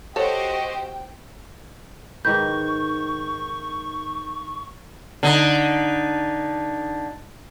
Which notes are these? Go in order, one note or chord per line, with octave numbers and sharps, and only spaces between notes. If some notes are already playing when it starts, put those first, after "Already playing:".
F#4 G4 A4 C5 C#5 D#5 G5
G#2 D#3 B4 C#6 G6
D3 D#4